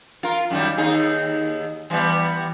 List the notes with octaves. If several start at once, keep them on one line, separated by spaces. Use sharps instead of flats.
F4 A#4
F#2 D#3 G3
D#2 D#4 G#4
E3 G3 B3